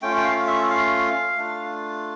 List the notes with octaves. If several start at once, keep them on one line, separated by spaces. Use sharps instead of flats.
A3 C#4 F4 G5
G5
F5
E5
F5
A3 D4 F4